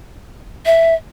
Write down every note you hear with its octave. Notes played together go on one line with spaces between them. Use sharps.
E5